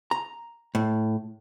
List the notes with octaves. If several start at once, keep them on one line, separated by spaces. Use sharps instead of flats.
A#5
A2